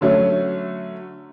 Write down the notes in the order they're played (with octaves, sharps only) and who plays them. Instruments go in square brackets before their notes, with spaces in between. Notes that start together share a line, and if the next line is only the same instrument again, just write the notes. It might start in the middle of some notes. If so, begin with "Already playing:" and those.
[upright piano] D3 F#3 A3 C#4